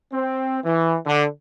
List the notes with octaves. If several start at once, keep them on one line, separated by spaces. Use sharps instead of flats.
C4
E3
D3